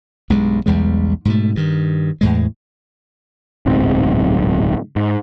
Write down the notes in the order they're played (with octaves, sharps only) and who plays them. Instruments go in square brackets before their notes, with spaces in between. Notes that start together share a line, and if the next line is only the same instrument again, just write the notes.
[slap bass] B1 G2 G#3
B1 E2 G3 G#3
G#2 B2 A3
G2 D#3
E2 A2 G#3
[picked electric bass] D1 B1 G#2 C4
G#2